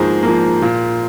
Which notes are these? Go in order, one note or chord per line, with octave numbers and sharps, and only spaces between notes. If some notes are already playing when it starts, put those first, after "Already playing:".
Already playing: G#2 F3 A#3 G#4 C5
F3 A#3
A#2